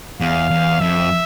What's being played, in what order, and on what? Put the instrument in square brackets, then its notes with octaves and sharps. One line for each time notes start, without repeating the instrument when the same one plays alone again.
[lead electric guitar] E2 [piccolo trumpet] F5
[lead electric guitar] E2
[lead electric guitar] F2 [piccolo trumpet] E5